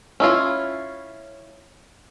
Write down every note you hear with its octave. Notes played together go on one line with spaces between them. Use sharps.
C#4 E4 F4